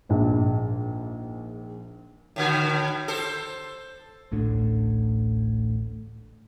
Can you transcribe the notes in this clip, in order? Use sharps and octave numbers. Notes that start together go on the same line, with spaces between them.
A#1 G#2
A2 D3 F#4
A4 C5
A1 D2 A2 D3